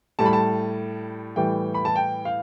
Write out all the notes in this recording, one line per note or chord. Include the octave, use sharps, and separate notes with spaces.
A2 G3 A5
B5
A5
A2 E3 G3 G5
B5
A5
G5
F5